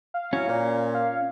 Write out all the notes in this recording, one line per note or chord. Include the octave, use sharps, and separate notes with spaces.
F5
F#3 C#4 E4 F#4
A#2
F5